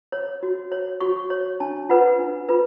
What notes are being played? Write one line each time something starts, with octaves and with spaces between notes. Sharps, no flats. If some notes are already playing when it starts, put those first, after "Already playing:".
C#5
F#4
C#5
F#4 C#6
C#5
D4 A5
F4 B4 F#5
D4
F4 B4